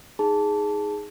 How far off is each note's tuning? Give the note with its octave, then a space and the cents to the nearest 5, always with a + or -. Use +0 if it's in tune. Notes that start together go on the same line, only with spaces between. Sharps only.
D#4 +10 G#4 +0 A5 +0